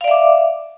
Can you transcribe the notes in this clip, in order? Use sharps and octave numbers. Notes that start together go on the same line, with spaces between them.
D5 E5 F5 D6